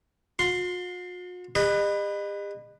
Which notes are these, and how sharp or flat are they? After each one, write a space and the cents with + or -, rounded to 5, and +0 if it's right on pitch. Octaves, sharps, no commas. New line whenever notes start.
F#4 -45 C6 +0
G4 +45 B4 +0 D#5 -35